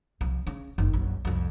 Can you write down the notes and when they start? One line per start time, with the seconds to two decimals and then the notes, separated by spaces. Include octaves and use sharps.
0.21 C2 F3
0.47 C#3
0.78 F#1 D#3
0.93 A#1 F#2
1.25 C2 F2